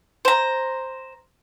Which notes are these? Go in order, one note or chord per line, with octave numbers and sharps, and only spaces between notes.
C5 A#5